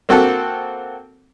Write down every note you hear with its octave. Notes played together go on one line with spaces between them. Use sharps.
A#3 C4 F#4 A4